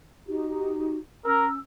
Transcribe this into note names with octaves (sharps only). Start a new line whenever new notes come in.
D#4 F#4 G4
C#4 A#4 E6